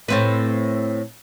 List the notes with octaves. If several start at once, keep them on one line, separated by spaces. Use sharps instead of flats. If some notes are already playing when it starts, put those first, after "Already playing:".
A2 C4 B4